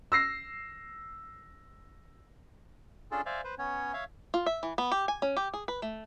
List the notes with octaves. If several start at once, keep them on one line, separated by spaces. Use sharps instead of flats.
E6 A#6 C7
C#4 D4 F4 G#4 A4
C5 D5 E5 F5 G#5
B4 C5
B3 C#4 C#5
C#5 E5 F5
F4
E5
E3
B3
G4
G#5
C#4
G4
G#4
B4
A3